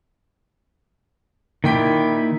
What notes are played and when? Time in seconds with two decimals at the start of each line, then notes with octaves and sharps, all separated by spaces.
1.64 A#2 D#3 E4 G5 B6